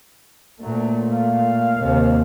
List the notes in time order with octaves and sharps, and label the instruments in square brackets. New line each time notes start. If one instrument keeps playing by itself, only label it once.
[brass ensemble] D2 F#3 [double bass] A#2 A3
[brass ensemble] F5
[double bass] D#2 C3